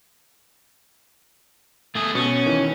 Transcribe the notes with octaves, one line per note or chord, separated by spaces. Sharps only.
A3 G#4
B2 C#4
D#3 E3